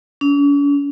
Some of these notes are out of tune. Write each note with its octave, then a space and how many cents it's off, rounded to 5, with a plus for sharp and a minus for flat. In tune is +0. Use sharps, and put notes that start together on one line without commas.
C#4 +45